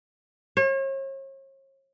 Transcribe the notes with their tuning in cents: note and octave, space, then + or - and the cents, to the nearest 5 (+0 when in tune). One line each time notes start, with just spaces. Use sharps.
C#5 -40